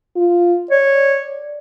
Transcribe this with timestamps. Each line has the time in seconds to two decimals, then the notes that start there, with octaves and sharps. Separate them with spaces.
0.16 F4
0.71 C#5 D5